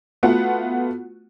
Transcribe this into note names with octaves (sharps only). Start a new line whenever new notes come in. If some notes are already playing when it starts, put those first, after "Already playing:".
A3 B3 F4 F#4 F#5